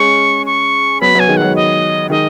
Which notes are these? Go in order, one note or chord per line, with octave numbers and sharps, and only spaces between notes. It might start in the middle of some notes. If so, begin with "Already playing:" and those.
Already playing: G#3 C#4 C#6
C#6
F#3 B3 B5
F#3 B3 G#5
D#3 G#3
F#5
F#3
D#5
D#3 G#3 D#5